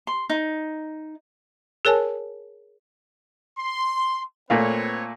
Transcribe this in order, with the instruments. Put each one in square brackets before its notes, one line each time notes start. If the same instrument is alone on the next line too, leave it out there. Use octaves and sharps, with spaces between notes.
[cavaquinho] C6
D#4
[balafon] G#4 A#4 C#5 G#5 A5
[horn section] C6
[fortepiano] A#2 A3 F5 [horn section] C4 B4 C#5